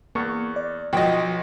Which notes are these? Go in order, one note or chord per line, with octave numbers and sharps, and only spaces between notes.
E2 A#3 C#6
D5
B1 F3 F#4 D#5 G5